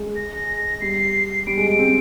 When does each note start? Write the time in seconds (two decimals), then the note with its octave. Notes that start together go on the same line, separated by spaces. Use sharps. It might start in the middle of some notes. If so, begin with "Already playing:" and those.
Already playing: G#3
0.16 A#6
0.81 G3 C7
1.47 G3 D7
1.57 G#3
1.68 G#3
1.79 G#3 C4